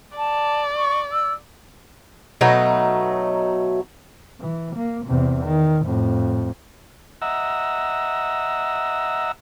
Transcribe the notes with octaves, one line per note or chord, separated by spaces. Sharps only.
D5 A5
C#6
E6
B2 F#3 A3 D#4
E3
A#3
E2 C3
D#3
F2 A2
D#5 E5 F#5 A#5 E6